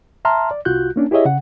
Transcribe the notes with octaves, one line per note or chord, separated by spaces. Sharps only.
E5 A5 A#5 C6 F6
D5
C2 F4 F#4 F#6 G6
A#3 C#4 D4
E4 G4 G#4 C#5 D#5 E5
C#3 F#5